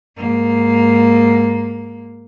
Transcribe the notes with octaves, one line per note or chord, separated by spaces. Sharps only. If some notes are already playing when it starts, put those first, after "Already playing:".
G#2 A#3